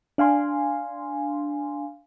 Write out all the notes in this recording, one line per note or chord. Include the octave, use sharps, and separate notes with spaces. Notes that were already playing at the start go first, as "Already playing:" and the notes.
D4 F5 G#5 C6